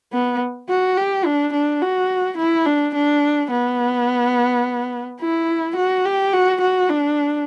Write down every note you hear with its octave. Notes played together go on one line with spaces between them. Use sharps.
B3
F#4
G4
D4
D4
F#4
E4
D4
D4
B3
E4
F#4
G4
F#4
F#4
D4